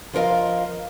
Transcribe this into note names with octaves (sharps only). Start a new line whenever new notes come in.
F3 F4 A#4 D#5 F5